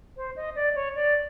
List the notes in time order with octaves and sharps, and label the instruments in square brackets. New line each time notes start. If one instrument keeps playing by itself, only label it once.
[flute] C5
D#5
D5
C#5
D5